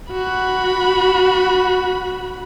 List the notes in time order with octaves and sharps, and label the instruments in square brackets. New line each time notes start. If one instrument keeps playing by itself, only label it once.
[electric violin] F#4 B5